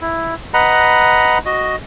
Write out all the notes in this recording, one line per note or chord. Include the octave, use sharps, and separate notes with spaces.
E4
B4 D#5 F#5 A#5 B5
F#4 D#5